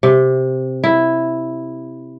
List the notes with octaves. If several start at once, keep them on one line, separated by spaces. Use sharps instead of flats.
C3
E4